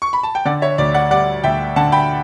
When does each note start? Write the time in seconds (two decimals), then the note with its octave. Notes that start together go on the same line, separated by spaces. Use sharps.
0.02 C#6
0.13 B5
0.23 A5
0.35 G5
0.45 D3 D5 F#5
0.62 C#5 E5
0.78 D2 D5
0.94 D5 F#5
1.11 G3 D5 F#5
1.44 D2 E5 G5
1.76 D3 F#5 A5
1.92 G5 B5